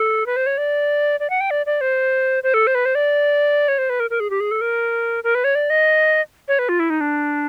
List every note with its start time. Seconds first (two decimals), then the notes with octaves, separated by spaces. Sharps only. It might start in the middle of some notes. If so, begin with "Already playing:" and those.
Already playing: A4
0.26 B4
0.36 C5
0.46 C#5
0.58 D5
1.20 D5
1.30 F#5
1.41 G5
1.51 D5
1.66 D5
1.81 C5
2.43 C5
2.54 A4
2.67 C5
2.75 B4
2.85 C5
2.95 D5
3.68 C#5
3.78 C5
3.90 B4
4.00 A#4
4.10 A#4
4.20 G#4
4.30 G4
4.40 G#4
4.51 A4
4.61 A#4
5.24 A#4
5.35 B4
5.44 C#5
5.55 D5
5.70 D#5
6.48 C#5
6.59 B4
6.69 F4
6.80 E4
6.90 D#4
7.01 D4